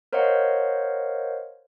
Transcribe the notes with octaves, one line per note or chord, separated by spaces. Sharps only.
A#4 C5 C#5 D#5 F5 F#5